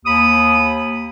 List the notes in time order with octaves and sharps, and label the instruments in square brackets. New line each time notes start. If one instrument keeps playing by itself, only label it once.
[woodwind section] D#2 B5 D#6